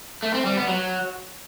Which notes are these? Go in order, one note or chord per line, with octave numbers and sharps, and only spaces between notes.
A3
C4
G3
B3
F#3